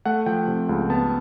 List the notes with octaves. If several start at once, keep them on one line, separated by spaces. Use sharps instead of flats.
A3 F#5
F3 G5
C3
C#2
B3 A5